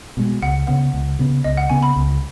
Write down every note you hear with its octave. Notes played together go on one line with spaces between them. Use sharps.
B2 G#3
C#2 F#5
C#3 B3 F#5
C#2
C#3 B3
C#2 D#5
F#5
C#3 B3 G#5
B5
C#2